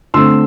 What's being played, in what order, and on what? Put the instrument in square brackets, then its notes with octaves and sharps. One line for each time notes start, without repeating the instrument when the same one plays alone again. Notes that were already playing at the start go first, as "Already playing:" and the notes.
[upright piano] D3 A3 C4 C6 E6